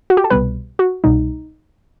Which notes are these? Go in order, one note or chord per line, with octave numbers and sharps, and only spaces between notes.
F#4
G4
A4
C2 B2 G3 B4
F#4
C2 B2 G3 D#4